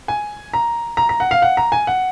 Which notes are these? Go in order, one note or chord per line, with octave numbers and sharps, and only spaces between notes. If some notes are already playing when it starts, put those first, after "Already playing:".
G#5
A#5
A#5
A#5
F#5
F5
F#5
A#5
G#5
F#5